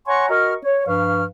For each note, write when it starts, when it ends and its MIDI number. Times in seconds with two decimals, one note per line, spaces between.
0.07 0.30 73
0.07 0.30 78
0.07 0.30 80
0.07 0.30 82
0.07 0.30 84
0.07 0.30 85
0.30 0.53 66
0.30 0.53 70
0.30 0.53 75
0.30 0.53 85
0.30 0.53 89
0.63 0.84 73
0.87 1.24 43
0.87 1.24 53
0.87 1.24 71
0.87 1.24 77
0.87 1.24 85
0.87 1.24 89